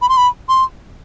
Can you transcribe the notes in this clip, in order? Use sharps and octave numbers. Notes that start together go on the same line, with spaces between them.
B5
C6
B5
C6